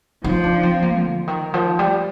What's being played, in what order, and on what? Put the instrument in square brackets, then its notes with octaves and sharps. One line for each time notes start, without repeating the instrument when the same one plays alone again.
[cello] F3 [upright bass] D#4
[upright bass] D4
C4
A#3
D3
D#3
F3
G3